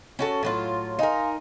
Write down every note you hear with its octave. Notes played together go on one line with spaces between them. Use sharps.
C#4 F#4 A4
A2 F#3 F4
D#4 A#4 F5 G#5 C6